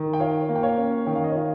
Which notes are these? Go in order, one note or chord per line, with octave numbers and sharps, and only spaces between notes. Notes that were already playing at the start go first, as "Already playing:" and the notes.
Already playing: D#3
G5
F4 C#5 F5
A#3
G5
C#5 F5
C#4
D#3 G5
F5
D#5
F4 C#5 F5